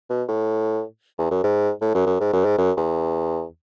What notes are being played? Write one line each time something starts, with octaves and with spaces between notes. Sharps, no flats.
B2
A2
E2
F#2
G#2
A2
F#2
F#2
G#2
F#2
G#2
F#2
E2